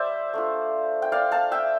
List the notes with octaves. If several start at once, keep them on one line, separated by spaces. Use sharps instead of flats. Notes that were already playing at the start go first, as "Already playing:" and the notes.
Already playing: G3 C5 D5 E5
A3 D4 F4
G5
D5 F5
F5 A5
E5 G5